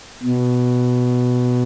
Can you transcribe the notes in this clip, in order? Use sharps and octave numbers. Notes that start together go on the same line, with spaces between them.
B2